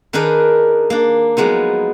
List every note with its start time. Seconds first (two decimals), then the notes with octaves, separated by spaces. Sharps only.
0.13 D#3 D4 D#4 G#4 A#4 B4
0.90 A#3 D4
1.37 F3 F#3 G#3 B3 D#4